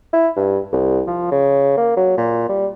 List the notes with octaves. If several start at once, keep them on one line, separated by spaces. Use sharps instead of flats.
E4
G2
C2
F3
C#3
A#3
F#3
A#2
G3